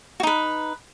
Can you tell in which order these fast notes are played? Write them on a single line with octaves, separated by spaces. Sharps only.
F#4 D#4 B4